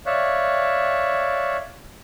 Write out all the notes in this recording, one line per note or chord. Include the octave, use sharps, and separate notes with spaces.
C#5 D5 E5 F5 F#6